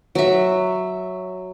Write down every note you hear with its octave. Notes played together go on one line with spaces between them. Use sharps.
F#3 E5